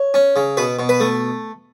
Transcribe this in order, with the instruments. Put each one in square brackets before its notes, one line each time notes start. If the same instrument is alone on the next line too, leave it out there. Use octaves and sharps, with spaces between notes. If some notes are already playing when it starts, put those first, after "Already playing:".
Already playing: [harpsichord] C#5
C#4
C#3
B2 B4
B2
B4
A3